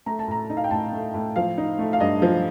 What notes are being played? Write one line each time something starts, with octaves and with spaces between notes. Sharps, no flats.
A3 A#5
A5
A2 A#5
D#4 D#5
F5
G5
A2 A5
A3
A2
F3 F5
D#4
A3
F5
G2 D#5
F3